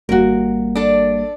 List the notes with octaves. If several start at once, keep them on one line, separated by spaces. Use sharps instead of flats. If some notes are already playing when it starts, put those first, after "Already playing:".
G#1 G3 A#3 F#4 A#4
D4 A4